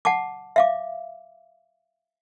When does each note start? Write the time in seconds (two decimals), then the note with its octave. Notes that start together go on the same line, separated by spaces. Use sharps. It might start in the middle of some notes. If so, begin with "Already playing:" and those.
0.05 F#5 A5 D6
0.56 E5 F5 D6